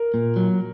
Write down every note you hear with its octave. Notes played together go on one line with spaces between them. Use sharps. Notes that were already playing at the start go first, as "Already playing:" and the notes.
Already playing: A#4
A#2
F#3